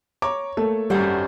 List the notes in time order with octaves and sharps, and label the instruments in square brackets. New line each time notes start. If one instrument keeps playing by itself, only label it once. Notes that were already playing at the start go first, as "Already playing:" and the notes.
[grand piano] C#5 [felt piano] A#5 D6
[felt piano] A3 A#3 [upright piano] A4
[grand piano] G#1 F#2 [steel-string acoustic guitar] G3 C5 F#5